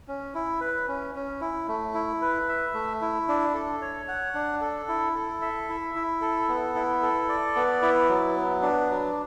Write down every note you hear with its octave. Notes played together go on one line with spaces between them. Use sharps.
C#4
E4
B4
C#4
C#4
E4
A3
E4
B4
E5
A3
E4
D4
A4
C#5
F#5
D4
A4
E4
A4
E5
E4
E4
A4
B3
E4
A4
D5
B3
E4
F#3
B3
D4
F#3